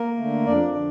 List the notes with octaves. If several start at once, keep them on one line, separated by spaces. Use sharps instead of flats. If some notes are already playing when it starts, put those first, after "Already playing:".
Already playing: A#3 A#4
D3 A3
F2 D4 D5
D3